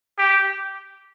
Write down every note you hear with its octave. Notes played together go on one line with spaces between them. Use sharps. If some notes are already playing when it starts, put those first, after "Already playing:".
G4